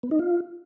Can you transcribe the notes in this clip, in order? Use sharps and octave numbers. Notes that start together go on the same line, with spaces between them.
B3
D#4
F4